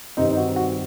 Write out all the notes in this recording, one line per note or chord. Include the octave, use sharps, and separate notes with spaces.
G2 D#3 G3 C4 D#4
D#4
F#4
F#4